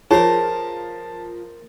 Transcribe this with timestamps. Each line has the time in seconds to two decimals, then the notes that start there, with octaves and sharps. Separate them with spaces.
0.11 F3 G#4 A#4 C5 C#5 A5